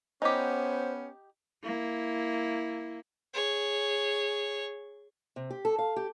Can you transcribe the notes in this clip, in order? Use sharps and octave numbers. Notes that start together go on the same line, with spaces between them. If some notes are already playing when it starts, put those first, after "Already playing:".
B3 C#4 D#4 G4 C5
A#3 E4
G#4 C#5
C3
G4
A4
F5
G4